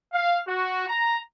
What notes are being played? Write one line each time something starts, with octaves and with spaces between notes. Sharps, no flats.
F5
F#4
A#5